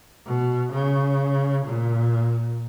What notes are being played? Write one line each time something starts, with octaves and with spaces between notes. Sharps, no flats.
B2
C#3
A#2